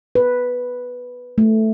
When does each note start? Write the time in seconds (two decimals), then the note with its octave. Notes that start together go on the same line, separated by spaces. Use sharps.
0.15 B4
1.38 A3